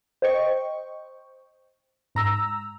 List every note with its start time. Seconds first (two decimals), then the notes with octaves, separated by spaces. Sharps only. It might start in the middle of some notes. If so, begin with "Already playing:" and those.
0.22 C5 D#5 G5 C#6
2.15 G#2 A#5 E6